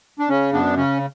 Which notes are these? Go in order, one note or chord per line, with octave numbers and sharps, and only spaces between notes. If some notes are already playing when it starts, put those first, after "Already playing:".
D4
C#3 C#4
F#2 B3 D4
C#3 C#4